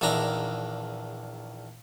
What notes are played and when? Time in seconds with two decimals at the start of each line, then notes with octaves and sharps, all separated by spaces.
0.01 A#1 E2 D#3 D4 E5 A#5